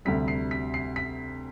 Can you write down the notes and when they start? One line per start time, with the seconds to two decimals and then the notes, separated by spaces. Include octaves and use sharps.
0.05 D2 C3 G3 B6
0.28 C7
0.51 B6
0.74 C7
0.96 B6